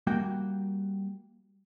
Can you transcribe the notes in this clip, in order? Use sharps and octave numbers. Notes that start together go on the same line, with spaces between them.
G3 A#3 F#4 G5